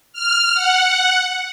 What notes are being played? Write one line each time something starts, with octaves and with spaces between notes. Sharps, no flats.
F6
F#5